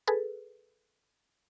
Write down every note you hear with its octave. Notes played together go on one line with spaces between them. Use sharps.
G#4 A4 B4